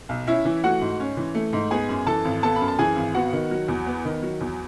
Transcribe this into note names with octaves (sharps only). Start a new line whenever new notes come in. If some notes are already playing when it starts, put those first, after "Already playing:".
B1
C#4 E4 E5
E3
A3 F#4 F#5
G#2
C#4
E3
A3
G#2
B3 G#4 G#5
F#2
E3 A4 A5
G#1
B3 A4 A5
F#2 B5
A5
E3 G#4 G#5
G#1
B3 F#4 F#5
D#3
F#3
E2
B3
D#3
F#3
E2